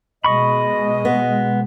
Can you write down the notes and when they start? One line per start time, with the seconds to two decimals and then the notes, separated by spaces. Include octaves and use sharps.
0.24 B2 G#3 D#5 B5 C#6
1.05 B3